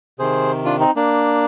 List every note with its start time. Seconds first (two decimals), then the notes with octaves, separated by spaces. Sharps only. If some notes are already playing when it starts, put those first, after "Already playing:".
0.19 C3 D#3 G#4 C5
0.65 D4 F4
0.80 C4 D#4
0.96 A#3 D4